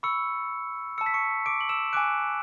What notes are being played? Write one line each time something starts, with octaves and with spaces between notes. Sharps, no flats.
B5 C#6 E6 C#7
A5 E6 C#7
B6
C#6 C#7
D6 D7
F#7
E6 E7
G#5 D6 F#6 D7